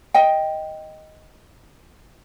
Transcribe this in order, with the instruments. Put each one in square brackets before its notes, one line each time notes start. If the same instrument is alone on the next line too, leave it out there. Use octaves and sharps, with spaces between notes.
[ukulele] D#5 G5